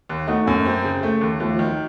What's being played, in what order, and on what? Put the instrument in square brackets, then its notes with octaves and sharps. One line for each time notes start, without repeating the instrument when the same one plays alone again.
[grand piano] D#2
[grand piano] A3 [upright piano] D#4 F#4
[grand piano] F#2 [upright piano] A#3 C#4
[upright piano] F#3 A#3 [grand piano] C4
[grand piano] C#3
A3
D#2
[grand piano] D#2 [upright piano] F3 A3
[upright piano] F3 A3
[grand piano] D#3
[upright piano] F#3